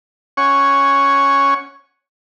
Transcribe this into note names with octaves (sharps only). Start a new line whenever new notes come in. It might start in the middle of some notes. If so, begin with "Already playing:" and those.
C#4 C#5 F#5 G#5 C#6